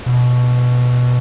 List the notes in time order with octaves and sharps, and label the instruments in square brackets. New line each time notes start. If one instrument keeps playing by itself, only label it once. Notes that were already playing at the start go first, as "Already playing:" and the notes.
[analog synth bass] B2